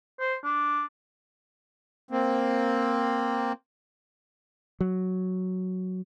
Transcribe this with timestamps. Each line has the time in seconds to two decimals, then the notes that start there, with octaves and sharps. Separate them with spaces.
0.20 C5
0.44 D4
2.11 A#3 C4
4.81 F#3